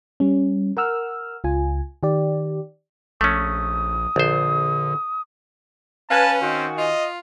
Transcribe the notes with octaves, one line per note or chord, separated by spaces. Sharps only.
G3 C#4
A#4 F#5 E6 F6
C#2 F4 G#5
D#3 G4 D5
A#1 A3 C#4 D#6
A#1 D3 C5
C#4 B4 F5 G#5 A5
D#3 C4 F#4
F4 D#5